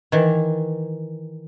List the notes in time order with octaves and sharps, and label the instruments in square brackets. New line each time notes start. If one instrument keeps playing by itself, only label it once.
[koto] D#3 E3